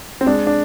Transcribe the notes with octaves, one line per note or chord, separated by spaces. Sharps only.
C4
G#3 D4
D4